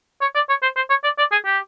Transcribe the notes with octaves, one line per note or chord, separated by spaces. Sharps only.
C#5
D5
C#5
C5
C5
C#5
D5
D5
G#4
G4